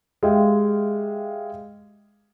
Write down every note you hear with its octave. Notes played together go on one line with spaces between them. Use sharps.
G#3 G4 E5 F5 G5